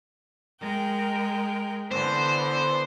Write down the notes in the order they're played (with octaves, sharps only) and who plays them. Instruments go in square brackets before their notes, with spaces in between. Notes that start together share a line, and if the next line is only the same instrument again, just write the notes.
[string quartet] G#3 A#4 G5
[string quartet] D3 E3 B3 [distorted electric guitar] C5